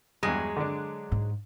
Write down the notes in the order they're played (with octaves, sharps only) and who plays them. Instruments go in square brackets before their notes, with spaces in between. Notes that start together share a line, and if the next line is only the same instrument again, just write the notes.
[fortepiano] E2 G2 [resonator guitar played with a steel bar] F#3 G#3
[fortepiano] D3 D4
[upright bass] G#2